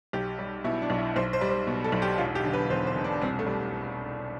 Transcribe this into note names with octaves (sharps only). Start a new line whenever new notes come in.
B1 G4
G3
B2 E4
D4
B1
E4
B1 C5
C5
G3
C5
B2
A4
B1
G4
E1 F4
G4
D3
B4
E2 C5
C5
E1
D4
C2 C4
A3
G3